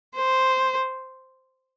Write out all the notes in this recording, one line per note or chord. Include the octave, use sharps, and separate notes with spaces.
C5